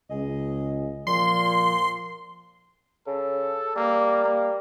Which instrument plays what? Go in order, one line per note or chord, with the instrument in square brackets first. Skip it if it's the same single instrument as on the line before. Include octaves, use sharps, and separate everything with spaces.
[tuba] C#2 [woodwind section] G#4 D#5
[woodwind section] A#2 [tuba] F3 [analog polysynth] C6
[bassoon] C#3 [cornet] A4
[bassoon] G3 [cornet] A#3
[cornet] A#3